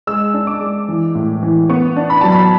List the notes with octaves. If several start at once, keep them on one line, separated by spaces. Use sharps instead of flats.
G#3 E6
D4
D6
G#3
E3
A2
E3
B3 C#6
D4
B5
F#3 A5
B5